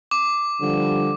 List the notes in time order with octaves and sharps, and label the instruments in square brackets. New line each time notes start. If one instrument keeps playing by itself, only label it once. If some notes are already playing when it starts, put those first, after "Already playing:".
[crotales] D6
[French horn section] D3 F3 G3